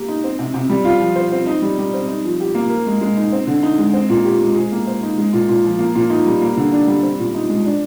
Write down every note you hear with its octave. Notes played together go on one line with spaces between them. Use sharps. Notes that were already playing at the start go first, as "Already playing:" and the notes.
Already playing: A#3 G4
D#4
C4
C3
C3
G3
F4
F3
C5
C4
D#4
G3
G3
C4
D#4
F3
G4
A#3
A#4
G#3
G#3
D#4
C4
D3
D#4
G#3
C4
A#2
G4
G#3
G#4
A#3
C5
D#4
G#3
A#2
A#2
F3
A#3
A#2
D#4
G3
A#3
D3
D4
G3
C4
A#2
D#4
G#3
D4